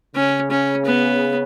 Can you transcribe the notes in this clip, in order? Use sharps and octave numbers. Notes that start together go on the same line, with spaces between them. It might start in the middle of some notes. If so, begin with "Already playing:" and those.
C#3 C#4
C#4
B3